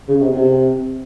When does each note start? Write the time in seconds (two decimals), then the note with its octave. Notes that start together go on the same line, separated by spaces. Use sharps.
0.08 C#3
0.20 C3
0.34 C3